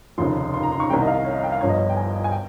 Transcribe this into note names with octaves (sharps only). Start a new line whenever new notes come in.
F1 D#2 C#3 F3 C6
C6
A#5
C6
C#6
C2 C3 D#3 G3 G5
D#5
F5
C#5
D#5
G5
F5
G1 G2 F3 C#5
D#5
C#5
G5
G#5
G#5
G5